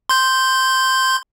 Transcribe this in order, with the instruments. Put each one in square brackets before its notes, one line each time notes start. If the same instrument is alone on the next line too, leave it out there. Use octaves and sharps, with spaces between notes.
[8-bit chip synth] C6 G6